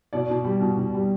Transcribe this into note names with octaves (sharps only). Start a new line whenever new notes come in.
B2 D5
B2
G3
B2
B2
G3